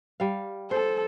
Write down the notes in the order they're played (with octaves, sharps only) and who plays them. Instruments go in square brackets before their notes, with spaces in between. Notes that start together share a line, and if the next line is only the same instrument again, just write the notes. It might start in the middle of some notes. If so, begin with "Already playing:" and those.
[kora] G3 F5
[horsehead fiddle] A4 [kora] C5